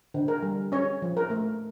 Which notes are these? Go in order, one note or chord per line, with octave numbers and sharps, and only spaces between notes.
D3
A#4
G3
C#4 C#5
F3
A#4
A3